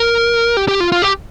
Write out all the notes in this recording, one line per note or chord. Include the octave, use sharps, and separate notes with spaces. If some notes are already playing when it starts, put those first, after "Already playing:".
Already playing: A#4
G4
G4
F4
F4
G4